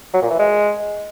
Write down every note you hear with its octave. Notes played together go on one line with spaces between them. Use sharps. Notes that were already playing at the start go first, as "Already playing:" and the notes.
F#3
A#2
E3
G#3